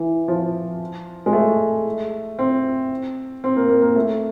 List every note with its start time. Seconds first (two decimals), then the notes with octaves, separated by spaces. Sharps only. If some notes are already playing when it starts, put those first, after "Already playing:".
Already playing: E3
0.28 F3
1.26 G#3
1.33 A3
2.39 C4
3.44 C4
3.57 A#3
3.69 A#3
3.82 A#3
3.96 A3